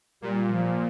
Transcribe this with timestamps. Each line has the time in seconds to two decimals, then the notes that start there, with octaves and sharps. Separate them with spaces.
0.22 A#2 G3
0.52 F3